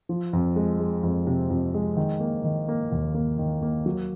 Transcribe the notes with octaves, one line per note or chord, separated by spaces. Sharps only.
F3
F2
G#3
G#3
F2
C3
F2
G#3
D#3
A#3
D#3
A#3
D#2
A#3
D#3
A#3
F#3